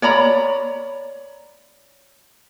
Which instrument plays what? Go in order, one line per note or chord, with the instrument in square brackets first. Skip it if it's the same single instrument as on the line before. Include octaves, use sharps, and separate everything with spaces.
[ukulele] C#5 D5 A#5 B5